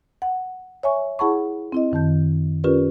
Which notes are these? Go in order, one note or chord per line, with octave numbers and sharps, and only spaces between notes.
F#5
C#5 E5 G#5 C#6
E4 G#4 F#5 A5 B5 C#6
C4 E4 D#5
F#2 D#3 A5 G6
C#4 F4 G4 A#4 B4 D5